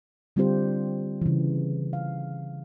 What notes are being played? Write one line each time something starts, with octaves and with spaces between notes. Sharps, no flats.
D3 G3 C4 F4 G4 C5
C#3 E3
F5